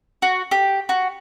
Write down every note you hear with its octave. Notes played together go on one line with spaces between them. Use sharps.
F#4
G4
F#4